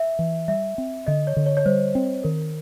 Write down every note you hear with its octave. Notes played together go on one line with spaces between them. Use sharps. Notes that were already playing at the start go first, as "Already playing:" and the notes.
Already playing: E5
E3
G3 E5
C4
D3 D#5
C#5
D3
C#5
C#5
G3 C5
C4
D#3 A#4